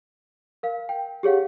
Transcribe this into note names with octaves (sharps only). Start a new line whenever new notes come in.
A#4 F5
G5
G4 G#4 C#5 F5 F#5